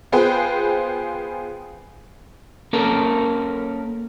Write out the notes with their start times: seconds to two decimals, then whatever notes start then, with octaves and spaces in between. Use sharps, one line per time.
0.12 B3 F4 G#4 B4 C5 G5
2.73 A#3 C#4 A4 A#4